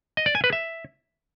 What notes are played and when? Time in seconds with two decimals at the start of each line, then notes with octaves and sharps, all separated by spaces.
0.17 D#5
0.26 D5
0.35 G#5
0.44 B4
0.53 E5